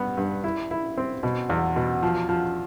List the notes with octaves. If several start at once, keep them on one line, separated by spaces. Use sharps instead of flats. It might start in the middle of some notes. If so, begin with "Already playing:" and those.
Already playing: G2 B3
G2
E4
E4
C4
B2
E2
B2
F3
F3